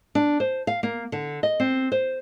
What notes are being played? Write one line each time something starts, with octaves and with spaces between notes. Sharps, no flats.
D4
C5
F5
A#3
D3
D#5
C4
C5